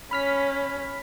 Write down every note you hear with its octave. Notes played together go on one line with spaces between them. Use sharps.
C#4 B5 F6 B6